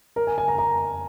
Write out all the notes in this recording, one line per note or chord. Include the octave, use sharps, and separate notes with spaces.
A#4
G#5
G#5
A#5
A#5